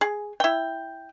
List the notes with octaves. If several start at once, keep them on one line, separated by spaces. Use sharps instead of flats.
G#4
E4 G5